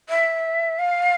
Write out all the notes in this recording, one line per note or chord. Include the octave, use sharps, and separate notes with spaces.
E5
F5